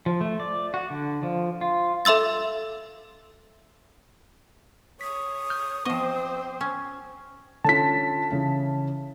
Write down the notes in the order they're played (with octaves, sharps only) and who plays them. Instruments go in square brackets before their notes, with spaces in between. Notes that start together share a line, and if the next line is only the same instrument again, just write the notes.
[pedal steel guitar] F3
A3
D5
F#4
D3
F3
F4
[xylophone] A4 E5 C6 E6 A6
[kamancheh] C#5 [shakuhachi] D#6 [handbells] B6
[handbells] F6 G6
[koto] F3 D#5 [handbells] B3 C#6 [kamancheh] C4 C5
[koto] C#4
[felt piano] D3 C#4 F4 [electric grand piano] A5 B6
[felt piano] C#3 E3 C#4